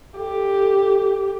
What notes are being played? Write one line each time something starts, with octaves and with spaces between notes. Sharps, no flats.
G4 A4